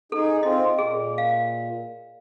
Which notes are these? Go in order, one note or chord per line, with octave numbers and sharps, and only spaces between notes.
D#4 G#4 A4
C4 F4 D#5
A#2 G#4
F5